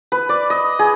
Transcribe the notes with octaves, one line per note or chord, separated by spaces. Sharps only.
B4
D5
D#5
G#4